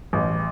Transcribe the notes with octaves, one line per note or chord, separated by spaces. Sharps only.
A1